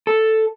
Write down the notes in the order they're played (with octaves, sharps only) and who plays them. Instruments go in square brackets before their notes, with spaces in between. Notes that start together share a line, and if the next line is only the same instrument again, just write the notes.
[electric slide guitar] A4